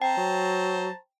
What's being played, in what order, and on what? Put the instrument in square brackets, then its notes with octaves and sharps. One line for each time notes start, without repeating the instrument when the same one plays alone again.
[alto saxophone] C4 [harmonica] C5 A5 A#5 [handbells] G5
[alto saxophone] F#3